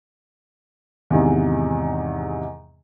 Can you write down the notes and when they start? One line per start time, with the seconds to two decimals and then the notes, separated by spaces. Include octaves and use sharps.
1.10 E2 G#2 C3 D#3 E3